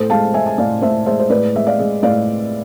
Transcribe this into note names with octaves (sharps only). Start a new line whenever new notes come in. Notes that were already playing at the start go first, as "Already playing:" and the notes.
Already playing: A2 A4 C5
G#3 F5 A5
G#3 E5 G#5
G#5
A2 D5 F5
A2 C5 E5
G#3 C5 E5
C5
A2 B4 D5
G#3 E5
D5 F5
G#3
A2 D5 F5